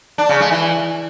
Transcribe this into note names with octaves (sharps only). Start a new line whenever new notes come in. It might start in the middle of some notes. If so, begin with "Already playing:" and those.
D4
C#3
G#3
E3